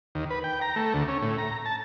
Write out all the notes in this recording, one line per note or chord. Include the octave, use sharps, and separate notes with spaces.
D#2
B4
G5
A#5
A3
D2
C#4
A2
A#5
A5